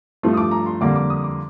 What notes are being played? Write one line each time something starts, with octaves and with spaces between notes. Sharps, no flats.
G2 F3 A3 C6
D#6
D6
A#5
C6
F2 D3 G3 A#3 D6
D6
D#6
D6